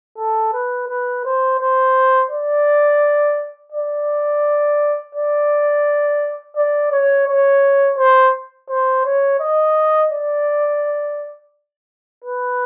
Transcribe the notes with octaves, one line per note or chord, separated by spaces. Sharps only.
A4
B4
B4
C5
C5
D5
D5
D5
D5
C#5
C#5
C5
C5
C#5
D#5
D5
B4